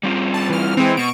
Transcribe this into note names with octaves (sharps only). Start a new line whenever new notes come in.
G3 C4 F4
A5
E3 F6
E3 G#3 C4
B2 C#6 D7